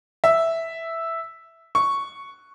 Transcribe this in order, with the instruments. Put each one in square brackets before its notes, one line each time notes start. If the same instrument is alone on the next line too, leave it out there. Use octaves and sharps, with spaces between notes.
[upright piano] E5
C#6